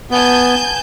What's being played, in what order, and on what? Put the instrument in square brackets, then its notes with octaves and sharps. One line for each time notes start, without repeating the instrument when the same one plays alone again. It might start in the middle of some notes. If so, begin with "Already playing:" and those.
[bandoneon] B3 [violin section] G#5 A5 G6